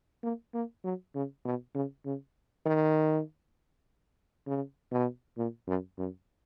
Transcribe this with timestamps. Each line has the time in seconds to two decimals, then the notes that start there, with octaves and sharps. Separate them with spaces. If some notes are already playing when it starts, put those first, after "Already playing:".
0.23 A#3
0.54 A#3
0.84 F#3
1.15 C#3
1.45 B2
1.75 C#3
2.06 C#3
2.66 D#3
4.47 C#3
4.92 B2
5.38 A#2
5.68 F#2
5.98 F#2